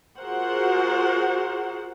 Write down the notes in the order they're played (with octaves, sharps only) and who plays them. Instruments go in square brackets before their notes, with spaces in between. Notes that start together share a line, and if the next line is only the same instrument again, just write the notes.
[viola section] F4 F#4 G#4 A#4 C5 F#5